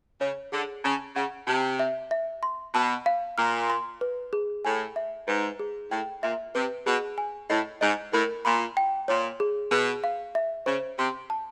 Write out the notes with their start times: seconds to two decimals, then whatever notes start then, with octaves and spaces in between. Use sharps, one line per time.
0.21 C#3 C#5
0.52 D3 G#4
0.84 C#3 A5
1.16 C#3 F#5
1.47 C3 A5
1.79 E5
2.11 E5
2.43 C6
2.74 B2 A5
3.06 F5
3.38 A#2 F6
3.70 C6
4.01 B4
4.33 G#4
4.65 A2 G#5
4.96 E5
5.28 G#2 B4
5.59 G#4
5.91 A2 G5
6.23 A#2 E5
6.55 C3 B4
6.86 B2 G#4
7.18 G#5
7.50 A2 D#5
7.81 G#2 D#5
8.13 A2 A#4
8.45 A#2 B5
8.77 G5
9.08 A#2 C#5
9.40 G#4
9.71 B2 G#4
10.04 F5
10.35 E5
10.66 C#3 C5
10.98 C3 C6
11.30 A5